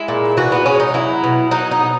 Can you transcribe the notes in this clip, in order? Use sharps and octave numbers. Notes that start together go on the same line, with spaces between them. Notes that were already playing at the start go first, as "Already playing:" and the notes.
Already playing: G#3 E4
A#2
E3 F#4
B3
G#3 C#4
D#4
F#3 E4
B2
F#3 D#4
D#4
B2